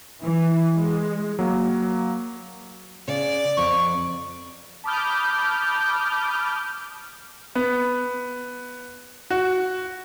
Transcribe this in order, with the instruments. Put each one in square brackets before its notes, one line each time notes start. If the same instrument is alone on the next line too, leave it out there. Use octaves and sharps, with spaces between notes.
[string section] E3
G#3
[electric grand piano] F#3 A#3
[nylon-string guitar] C#3 [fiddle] D5
[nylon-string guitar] F2 [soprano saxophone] C#6
[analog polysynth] A5 B5 D6 D#6 F6 G6
[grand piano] B3
F#4